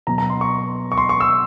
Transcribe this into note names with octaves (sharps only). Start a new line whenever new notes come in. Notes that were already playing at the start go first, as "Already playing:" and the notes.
B2 F#3 A#5
A#5
C6
C#6
C#6
C6
C#6
E6